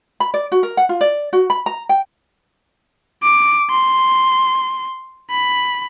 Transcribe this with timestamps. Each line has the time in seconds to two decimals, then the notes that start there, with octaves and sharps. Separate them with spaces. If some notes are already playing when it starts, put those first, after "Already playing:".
0.20 B5
0.34 D5
0.52 F#4
0.63 A#4
0.77 F#5
0.89 F4
1.01 D5
1.33 F#4
1.50 B5
1.66 A#5
1.89 G5
3.23 D6
3.71 C6
5.31 B5